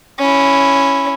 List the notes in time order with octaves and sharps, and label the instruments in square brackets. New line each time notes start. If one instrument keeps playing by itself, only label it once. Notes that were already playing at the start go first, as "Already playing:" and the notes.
[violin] C#4 E4